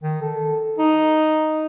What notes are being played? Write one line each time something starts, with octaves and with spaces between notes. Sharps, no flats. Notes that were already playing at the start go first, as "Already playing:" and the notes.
D#3
A4
D#4